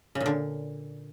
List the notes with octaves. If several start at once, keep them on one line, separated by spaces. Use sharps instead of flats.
C#3
A#2
D3